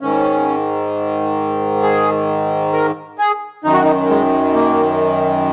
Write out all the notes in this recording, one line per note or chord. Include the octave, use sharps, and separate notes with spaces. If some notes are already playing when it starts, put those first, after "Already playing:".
G#2 D#3 C#4
G#4
A#4
G#4
F#2 D#3 D#4
F#4
D#4
G#3
A#3